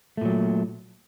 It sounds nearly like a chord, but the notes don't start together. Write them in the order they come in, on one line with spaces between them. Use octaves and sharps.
A3 A#2 F#3